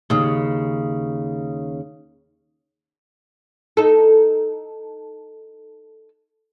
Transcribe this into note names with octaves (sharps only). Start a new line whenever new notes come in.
D#2 C#3
D#4 A4